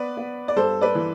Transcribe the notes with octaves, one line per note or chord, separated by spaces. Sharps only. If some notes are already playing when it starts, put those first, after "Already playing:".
Already playing: B3 B4 D5
B3
D5
G2 A4 C5
B4 D5
E3